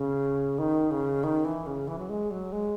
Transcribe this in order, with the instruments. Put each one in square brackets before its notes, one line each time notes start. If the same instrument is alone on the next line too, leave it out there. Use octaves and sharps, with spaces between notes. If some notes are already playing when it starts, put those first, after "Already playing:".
Already playing: [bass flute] C#3
D#3
C#3
D#3
E3
C#3
E3
F#3
G#3
F#3
G#3